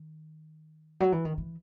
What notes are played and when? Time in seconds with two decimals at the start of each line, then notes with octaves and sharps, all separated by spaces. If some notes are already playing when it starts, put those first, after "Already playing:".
Already playing: D#3
1.00 F#3
1.12 E3
1.25 D#3
1.38 E3